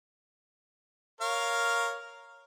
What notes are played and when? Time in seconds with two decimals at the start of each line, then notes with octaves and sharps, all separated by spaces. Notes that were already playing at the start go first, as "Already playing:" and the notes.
1.21 A#4 C#5 F5